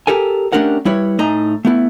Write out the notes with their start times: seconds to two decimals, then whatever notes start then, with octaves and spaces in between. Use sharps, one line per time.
0.07 G4 A4 A#4 G#5
0.52 A3 C#4 D4 G4 A#4 F#5
0.85 G3 E4 B4 C#5
1.19 A2 A3 D#4 D#5 G#5 A#5
1.65 A3 B3 E4